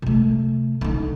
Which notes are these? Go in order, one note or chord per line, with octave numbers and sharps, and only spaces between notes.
C3 A3
D3 D#4